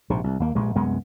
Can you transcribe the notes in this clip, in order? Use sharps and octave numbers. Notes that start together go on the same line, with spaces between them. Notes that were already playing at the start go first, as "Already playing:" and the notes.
A#1 G#2 C3
C2
D#2 A#3
A#1 G2 A#2 G#3
C2 F#2 G#3 B3